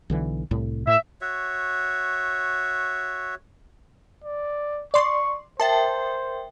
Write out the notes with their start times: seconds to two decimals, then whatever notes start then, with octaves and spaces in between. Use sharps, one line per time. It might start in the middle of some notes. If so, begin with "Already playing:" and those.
0.10 B1 D3 E3
0.51 C2 A2
0.87 A2 E5
1.21 F#4 C#5 E5
4.24 D5
4.94 D5 C6 C#6
5.60 A#4 C5 E5 G5 A5